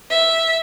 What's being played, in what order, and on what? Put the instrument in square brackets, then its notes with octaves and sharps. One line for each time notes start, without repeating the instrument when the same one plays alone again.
[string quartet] E5